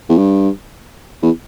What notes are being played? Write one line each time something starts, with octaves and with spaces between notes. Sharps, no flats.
E2
G2
E2